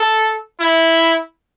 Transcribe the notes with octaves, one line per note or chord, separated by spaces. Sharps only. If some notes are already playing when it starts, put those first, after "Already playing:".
Already playing: A4
E4